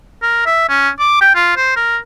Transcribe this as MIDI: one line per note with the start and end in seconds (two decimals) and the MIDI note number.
0.23 0.42 70
0.46 0.67 76
0.69 0.89 61
0.99 1.19 86
1.21 1.34 79
1.35 1.53 65
1.56 1.72 72
1.76 1.97 70